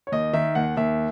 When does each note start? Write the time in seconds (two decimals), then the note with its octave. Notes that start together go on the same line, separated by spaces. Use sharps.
0.07 C#5
0.12 D#2 D#5
0.33 D#3 E5
0.55 D#2 F#5
0.77 D#2 E5